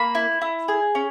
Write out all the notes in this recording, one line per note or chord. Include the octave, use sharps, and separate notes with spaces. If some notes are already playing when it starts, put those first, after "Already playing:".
Already playing: A#3 B5
E4
E4
G#4
C#4